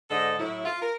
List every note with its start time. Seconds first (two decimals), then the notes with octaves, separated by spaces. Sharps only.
0.10 G#2 D3 A4 D#5
0.39 A2 F#3 E4
0.65 F4
0.81 A#4